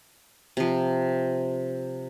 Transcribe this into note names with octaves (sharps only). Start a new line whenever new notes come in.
C3 F3